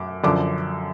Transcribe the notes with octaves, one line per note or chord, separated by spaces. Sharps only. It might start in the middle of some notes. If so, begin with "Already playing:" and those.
Already playing: F#2 D6
F#2 D3 F3 D6